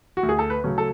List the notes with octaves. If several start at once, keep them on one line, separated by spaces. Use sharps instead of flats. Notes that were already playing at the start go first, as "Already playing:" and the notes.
F#4
D2
G#4
A4
B4
C#3 F#3 A3 C#4
A4